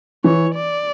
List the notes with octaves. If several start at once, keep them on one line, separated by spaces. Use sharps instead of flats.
E3 C#5
D5